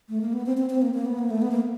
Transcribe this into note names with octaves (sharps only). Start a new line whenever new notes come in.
A3
A#3
B3
C4
C4
C4
A#3
A#3
B3
A#3
A3
B3
A#3